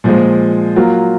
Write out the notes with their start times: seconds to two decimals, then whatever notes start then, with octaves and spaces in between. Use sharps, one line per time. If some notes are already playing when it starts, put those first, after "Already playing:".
0.04 A#2 F3 G#3
0.76 F#3 A#3 F4